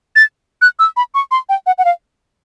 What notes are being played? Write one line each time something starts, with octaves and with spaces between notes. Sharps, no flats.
A6
F#6
E6
B5
C#6
C6
G5
F#5
F#5
F5